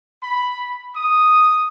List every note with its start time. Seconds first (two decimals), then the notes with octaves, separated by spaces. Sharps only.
0.24 B5
0.96 D#6